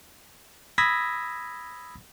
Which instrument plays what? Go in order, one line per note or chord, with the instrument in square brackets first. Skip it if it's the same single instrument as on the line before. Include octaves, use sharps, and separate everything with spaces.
[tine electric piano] B5 D#6 E6 G#6 A#6 B6